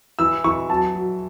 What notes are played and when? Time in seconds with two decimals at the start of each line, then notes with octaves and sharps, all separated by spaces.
0.19 E3 E6
0.44 E3 C#6
0.70 F#3 A5
0.95 F#3